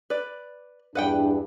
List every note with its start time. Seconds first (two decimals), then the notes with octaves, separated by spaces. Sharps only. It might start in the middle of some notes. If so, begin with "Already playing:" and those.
0.10 B4 D5
0.95 E2 G2 D4 B4 F#5 G5